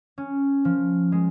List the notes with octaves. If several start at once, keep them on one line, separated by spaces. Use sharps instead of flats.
C#4
F3
G#3